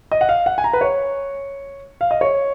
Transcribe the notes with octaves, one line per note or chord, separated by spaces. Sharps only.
D#5
F#5
F5
F#5
G#5
A#5
B4
C#5
F5
D#5
C#5